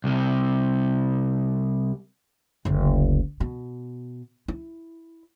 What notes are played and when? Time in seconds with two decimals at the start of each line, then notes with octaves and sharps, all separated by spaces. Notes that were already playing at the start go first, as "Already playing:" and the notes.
0.04 C2 C3
2.65 F#1 D2
3.40 B2
4.48 E4